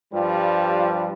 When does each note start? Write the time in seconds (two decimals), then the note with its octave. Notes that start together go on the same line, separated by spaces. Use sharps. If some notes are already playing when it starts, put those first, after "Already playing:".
0.13 G2 F3 G3